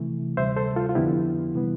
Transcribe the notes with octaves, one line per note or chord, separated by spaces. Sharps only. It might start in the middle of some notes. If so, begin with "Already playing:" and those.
Already playing: C3 E3 A3
D2 C3 G3 C5 E5
A4 C5
F4 A4
F4
F2 D3 F3 B3 E4 G4
C3 E3 G3 B3